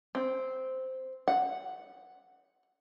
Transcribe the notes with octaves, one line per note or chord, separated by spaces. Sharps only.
C4
F#5